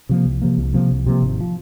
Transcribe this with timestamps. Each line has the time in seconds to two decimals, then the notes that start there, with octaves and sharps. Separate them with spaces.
0.09 C3 F3 A#3
0.25 C2
0.42 C3 F3 A#3
0.58 C2
0.74 C3 F3 A#3
0.91 C2
1.06 C3 F3 A#3
1.22 G#1
1.40 F3